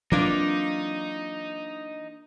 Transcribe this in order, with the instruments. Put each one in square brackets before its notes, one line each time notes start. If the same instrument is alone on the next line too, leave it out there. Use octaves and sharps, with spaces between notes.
[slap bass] E3 F#3 C4 [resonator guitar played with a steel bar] A#3 D4 F4 [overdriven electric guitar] D#4